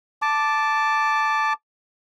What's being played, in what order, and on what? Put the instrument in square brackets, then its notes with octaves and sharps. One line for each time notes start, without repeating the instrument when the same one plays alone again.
[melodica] A5 D6